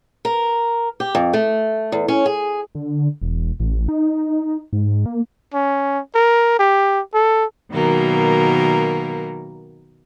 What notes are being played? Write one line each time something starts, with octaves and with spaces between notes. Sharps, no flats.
A#4
G4
F2
A3
E2
C#4
G#4
D3
E1
A1
D#4
G#2
A#3
C#4
A#4
G4
A4
B2 D#3 F#3 A#3 A#4